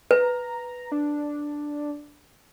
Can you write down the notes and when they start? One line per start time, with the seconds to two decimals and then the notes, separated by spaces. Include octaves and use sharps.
0.11 B4 A#5
0.92 D4